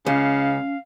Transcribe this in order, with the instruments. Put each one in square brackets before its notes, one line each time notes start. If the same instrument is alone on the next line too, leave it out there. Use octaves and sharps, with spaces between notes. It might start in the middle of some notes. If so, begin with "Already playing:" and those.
[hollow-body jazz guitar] C#2 [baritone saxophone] C#3 [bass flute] C#4 [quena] F5